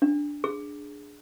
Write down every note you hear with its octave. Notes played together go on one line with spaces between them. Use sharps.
D4
G#4